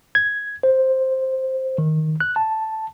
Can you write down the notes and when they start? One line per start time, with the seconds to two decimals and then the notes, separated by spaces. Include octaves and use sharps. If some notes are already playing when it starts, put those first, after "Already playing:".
0.15 G#6
0.63 C5
1.78 D#3
2.20 F#6
2.36 A5